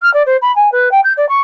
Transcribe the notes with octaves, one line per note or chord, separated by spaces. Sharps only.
F6
D5
C5
B5
G#5
B4
G5
G6
D5
C#6